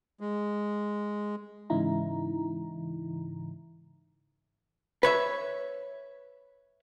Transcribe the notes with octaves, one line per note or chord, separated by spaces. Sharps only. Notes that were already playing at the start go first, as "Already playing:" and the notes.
G#3
G#2 C#3 E3 D#4 E4 A#5
B4 C#5 E5